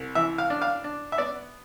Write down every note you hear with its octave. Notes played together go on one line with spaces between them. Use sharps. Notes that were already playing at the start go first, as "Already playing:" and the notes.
Already playing: C2
E3 E5
F5
D4
F5
D4
E5
B3 D5